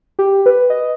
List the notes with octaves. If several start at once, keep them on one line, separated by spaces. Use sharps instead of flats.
G4
B4
D#5